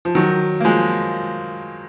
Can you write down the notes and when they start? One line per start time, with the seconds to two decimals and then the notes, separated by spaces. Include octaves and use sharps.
0.05 F3
0.15 D#3 F#3
0.60 A#3
0.64 F3 G#3